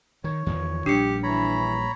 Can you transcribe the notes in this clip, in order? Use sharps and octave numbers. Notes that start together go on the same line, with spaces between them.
D#3 C#5
E2 D#3 F3
A#1 G3 D4 G4 C#7
E3 C#5 A#5 B5